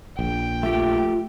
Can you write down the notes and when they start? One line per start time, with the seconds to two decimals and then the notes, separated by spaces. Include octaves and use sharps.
0.19 A#1 G5
0.63 A3 F4 G4